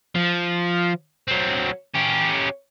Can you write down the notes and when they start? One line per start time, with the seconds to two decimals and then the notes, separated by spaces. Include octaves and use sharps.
0.15 F3
1.28 F#3 C4
1.95 C#4 G4